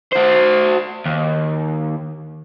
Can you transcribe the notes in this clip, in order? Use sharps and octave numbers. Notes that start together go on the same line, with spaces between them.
F#4 C5
D#2